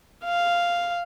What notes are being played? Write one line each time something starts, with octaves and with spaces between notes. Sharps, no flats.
F5